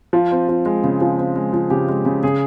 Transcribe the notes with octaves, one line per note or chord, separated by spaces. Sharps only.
F3 F4
C4
F3
G#3
C#3
F3
C4
G#3
F3
C#3 G4
G#3
C#3
C#3 G#4